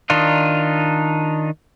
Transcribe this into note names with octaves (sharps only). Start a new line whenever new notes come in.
D#3 D4 D#4 F4